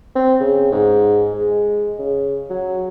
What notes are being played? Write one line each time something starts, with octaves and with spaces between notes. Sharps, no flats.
C4
C#3
G#2
G#3
C#3
F#3